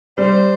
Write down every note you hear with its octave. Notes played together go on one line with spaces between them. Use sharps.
G3 C5